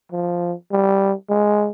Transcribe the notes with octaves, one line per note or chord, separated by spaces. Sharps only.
F3
G3
G#3